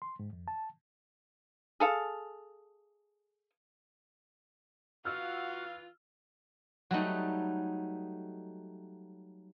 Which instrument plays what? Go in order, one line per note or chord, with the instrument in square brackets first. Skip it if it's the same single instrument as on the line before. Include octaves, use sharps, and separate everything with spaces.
[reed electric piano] C6
G#2
F2
A5
[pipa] G#4 A4 F5
[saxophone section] E3 F4 [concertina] F#4 F#5 [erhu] F5 [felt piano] E6 F6
[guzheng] F#3 G3 A3 D#4